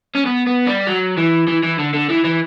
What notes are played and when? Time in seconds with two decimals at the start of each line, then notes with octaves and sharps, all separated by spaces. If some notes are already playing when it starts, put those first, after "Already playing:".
0.15 C#4
0.25 B3
0.46 B3
0.67 G3
0.87 F#3
1.18 E3
1.47 E3
1.63 E3
1.78 D3
1.94 D3
2.09 E3
2.24 E3